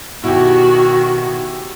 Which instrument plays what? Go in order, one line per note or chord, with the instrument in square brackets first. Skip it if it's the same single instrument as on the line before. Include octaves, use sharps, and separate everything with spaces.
[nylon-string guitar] B2 [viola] D#3 F#4 [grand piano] E4 G4